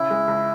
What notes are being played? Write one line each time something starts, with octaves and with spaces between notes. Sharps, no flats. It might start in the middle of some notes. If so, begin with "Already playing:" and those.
Already playing: C#3 E4
G#3
C#2